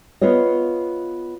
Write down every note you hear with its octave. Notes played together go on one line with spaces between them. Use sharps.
B3 F4 B4 C#5 D#5